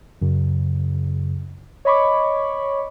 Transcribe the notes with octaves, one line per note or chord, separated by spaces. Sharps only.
F#2 C#3
C#5 D#5 B5 C#6 D6